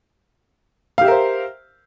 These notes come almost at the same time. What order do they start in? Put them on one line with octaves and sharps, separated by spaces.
F5 G4 E5 A#4 C5